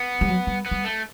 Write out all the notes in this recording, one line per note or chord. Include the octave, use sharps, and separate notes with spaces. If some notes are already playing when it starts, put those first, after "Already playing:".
Already playing: B3
G3
F#3
G3
B3
G3
A3